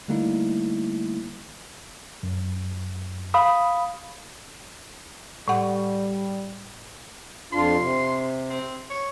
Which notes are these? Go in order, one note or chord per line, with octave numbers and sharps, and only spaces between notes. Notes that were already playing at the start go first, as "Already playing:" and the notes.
D3 G3 A3 A#3 D#4 E4
F#2
F5 B5 D#6
A2 G3 F#5
F2 D4 F4 C6
C3
C4
C#5